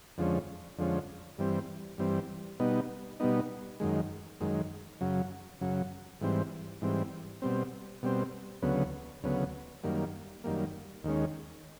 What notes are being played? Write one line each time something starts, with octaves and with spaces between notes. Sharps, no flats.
F2 D3 F3 G#3 C#4
F2 D3 F3 G#3 C#4
G2 E3 G3 C4
G2 E3 G3 C4
B2 G3 B3 D#4
B2 G3 B3 D#4
F#2 D#3 G#3
F#2 D#3 G#3
F#2 C#3 F#3
F#2 C#3 F#3
G#2 E3 G3 C4
G#2 E3 G3 C4
B2 G3 C4
B2 G3 C4
D2 C#3 F#3 B3
D2 C#3 F#3 B3
F#2 D#3 G3 A#3
F#2 D#3 G3 A#3
D#2 D#3 G#3 C#4